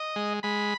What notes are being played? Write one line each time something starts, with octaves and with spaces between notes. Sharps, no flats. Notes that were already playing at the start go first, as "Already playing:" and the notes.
Already playing: D#5
G#3
G#3 B5